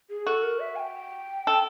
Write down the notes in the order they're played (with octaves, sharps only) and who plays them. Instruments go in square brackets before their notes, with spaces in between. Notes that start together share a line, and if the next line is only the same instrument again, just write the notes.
[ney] G#4
[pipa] F#4 [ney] A4
[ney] A#4
E5
G#5
G5
[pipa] A4